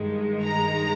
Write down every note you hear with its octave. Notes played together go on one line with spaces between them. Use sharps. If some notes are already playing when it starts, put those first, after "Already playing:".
Already playing: G2 D#3 G#3
A#5